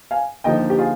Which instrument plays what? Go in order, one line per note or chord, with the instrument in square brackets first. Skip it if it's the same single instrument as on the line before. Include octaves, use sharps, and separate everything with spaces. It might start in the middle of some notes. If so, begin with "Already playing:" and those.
[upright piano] F5 G#5
[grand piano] D3 F3 A#3 D#4 [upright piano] D#5 G5
[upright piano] G4
F4 G#4